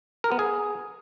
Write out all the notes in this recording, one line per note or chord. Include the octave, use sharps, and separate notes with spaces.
A#4
B3
G#4